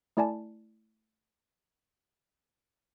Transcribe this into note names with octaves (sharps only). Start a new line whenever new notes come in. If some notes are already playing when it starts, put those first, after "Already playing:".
A3 E4 D5 G#5 A5